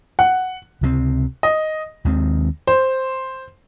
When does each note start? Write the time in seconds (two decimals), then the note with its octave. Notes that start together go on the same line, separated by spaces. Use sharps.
0.19 F#5
0.81 C#2 C3 F3 C4
1.43 D#5
2.05 D#2 D#3 G#3 C4
2.67 C5